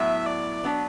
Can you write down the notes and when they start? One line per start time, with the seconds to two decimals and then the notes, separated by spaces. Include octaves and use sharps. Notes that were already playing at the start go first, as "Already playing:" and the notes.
Already playing: A2 F#3 B3 E4 E5
0.26 D5
0.64 F#3 B3 D4